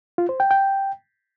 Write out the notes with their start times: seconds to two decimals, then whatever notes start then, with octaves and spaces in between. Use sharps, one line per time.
0.18 F4
0.29 C5
0.40 G5
0.51 G5